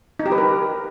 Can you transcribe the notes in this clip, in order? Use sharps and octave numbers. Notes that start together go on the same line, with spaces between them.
D#4
G4
B4
A#4